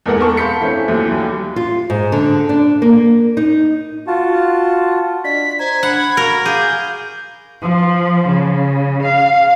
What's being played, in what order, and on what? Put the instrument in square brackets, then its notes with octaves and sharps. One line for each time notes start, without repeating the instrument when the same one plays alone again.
[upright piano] E2 G#2 A#3 A4 A#4 F#5
A4 A#4 A5 C#6
F5 B5 C6 G6 B6 C#7
E3 A3 C4 C#4
D#2 E3 F#3 A3
D#2 F#3 G3
[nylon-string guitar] F4
G#2
D3
D4
A#3
D#4
[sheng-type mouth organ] F4 F#4 A5
[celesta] D4 D5 D#5 [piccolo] B6
[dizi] C5 [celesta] A#5 [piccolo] G#6
[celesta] D4 C7 [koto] F#5 [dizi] B5
[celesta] F#4 F5 C#6 [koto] A#4
[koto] G#4 [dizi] F5 [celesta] D6 D#7 [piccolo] G6
[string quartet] F3
C#3
F5